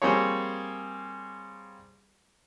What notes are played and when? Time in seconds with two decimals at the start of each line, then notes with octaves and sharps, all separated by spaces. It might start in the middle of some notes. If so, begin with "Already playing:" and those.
0.02 G3 A#3 C4 G#4 C#5